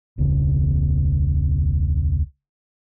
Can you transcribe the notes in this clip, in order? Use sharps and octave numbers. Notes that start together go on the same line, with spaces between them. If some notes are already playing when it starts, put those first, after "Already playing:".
E1 C#2 C#3